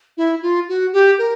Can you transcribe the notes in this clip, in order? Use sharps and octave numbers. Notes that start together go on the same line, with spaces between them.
E4
F4
F#4
G4
A#4